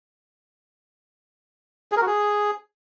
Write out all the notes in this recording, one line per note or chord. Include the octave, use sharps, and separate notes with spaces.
G#4
A#4
F#4
G#4